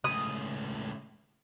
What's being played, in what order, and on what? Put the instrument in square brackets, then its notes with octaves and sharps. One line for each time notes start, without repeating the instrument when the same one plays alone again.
[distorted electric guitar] C#2 A2 [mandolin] D#6